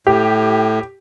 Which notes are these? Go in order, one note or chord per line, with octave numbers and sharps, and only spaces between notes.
A2 G4